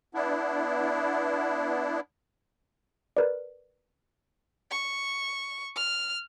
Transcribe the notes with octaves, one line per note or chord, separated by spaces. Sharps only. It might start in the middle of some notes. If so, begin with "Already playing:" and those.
B3 D4 E4
A#4 B4 D5
C#6
F6